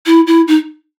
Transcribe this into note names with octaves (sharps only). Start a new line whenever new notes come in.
E4
E4
D#4